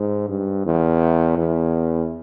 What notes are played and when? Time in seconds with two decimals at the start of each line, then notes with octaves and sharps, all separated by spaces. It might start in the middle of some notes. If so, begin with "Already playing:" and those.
Already playing: G#2
0.29 G2
0.65 E2
1.37 E2